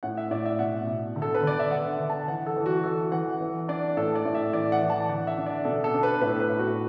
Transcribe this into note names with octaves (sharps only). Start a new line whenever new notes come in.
A2 F#5
E5
A2 D5
E5
B2 F#5
B2
D3
A4
B4
D3 D5
E5
D3 F#5
D3
A5
E3 F#5
A4
E3
F#4
E3 A4
E3 F#5
E3
D4 D5
A2 A4
D5
A2
E5
E3 D5
F#5
E3
A5
D3 F#5
E5
D4
D5
B2 A4
A4
D4
B4
A2 B4
B4
A2
F#4